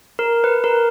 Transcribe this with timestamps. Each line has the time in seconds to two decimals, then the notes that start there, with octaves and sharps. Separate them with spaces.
0.19 A#4
0.44 B4
0.64 A#4